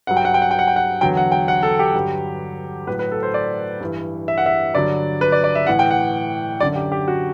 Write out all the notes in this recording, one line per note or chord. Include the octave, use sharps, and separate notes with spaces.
G2 F#3 F#5
G5
F#5
G5
F#5
G5
F#5
G5
F#5
E2 D3 F#3 G5
F#5
G5
F#5
A4
G4
G2 D3 F#3
A2 F#3 B4
B4
A4
C5
D5
G2 E3
E5
F#5
E5
G2 D3 F#3 D5
B4
D5
D5
E5
A2 E3 F#5
G5
F#5
F#2 D3 F#3 D5
G4
G4
F#4